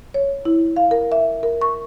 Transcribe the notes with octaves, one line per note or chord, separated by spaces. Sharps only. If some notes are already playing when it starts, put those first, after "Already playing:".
C#5
E4
F5
A#4
E5
A#4
C#6